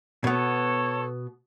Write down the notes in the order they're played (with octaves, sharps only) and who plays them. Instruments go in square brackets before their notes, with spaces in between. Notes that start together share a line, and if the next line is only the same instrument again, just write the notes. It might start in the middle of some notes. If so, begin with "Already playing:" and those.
[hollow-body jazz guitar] B2 B3 [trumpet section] A4 C#5